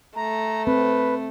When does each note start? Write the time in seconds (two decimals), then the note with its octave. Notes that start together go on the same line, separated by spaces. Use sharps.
0.17 A3 A#5
0.67 C4 B4